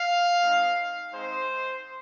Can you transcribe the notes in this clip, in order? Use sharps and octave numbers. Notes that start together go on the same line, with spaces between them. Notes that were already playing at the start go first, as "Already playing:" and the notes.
Already playing: F5
G#3 C4 D#4
G#3 C4 D#4 C5